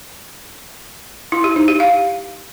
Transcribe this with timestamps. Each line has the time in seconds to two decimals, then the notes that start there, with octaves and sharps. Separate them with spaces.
1.32 E4
1.44 G4
1.56 D#4
1.68 G4
1.80 F5